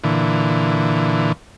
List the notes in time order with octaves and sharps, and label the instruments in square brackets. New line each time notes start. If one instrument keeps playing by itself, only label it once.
[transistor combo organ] A#2 D3 E3